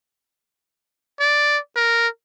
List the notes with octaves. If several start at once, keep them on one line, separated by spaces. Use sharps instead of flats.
D5
A#4